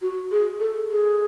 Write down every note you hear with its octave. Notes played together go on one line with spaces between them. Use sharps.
F#4
G#4
A4
G#4